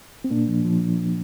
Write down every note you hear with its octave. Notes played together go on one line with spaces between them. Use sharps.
C4
A#2 A#3 D4
F3
F3